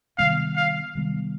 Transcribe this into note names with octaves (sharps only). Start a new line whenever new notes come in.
C3 D#3 G3 B3 F5
F5
C3 D#3 G3 B3